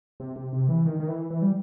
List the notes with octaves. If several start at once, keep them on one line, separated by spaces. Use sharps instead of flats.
C3
C3
C3
E3
D#3
D#3
E3
E3
G3